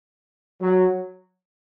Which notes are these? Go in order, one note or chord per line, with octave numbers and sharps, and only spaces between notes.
F#3